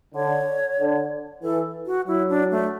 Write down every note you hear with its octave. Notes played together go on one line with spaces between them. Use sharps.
D3 C#5
D3
E3 A4
F#4
F#3 E4
D4
A3